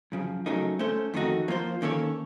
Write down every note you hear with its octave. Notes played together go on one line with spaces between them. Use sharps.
F#2 C#3 F3
C#3 F#3 A3 D#4 A#4
A3 C#4 A4 C5
F2 D#3 A3 D#4 F#4
F3 A#3 F4 C5
D#3 A#3 C#4 A4 C#5